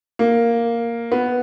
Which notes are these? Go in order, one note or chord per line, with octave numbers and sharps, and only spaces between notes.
A#3
B3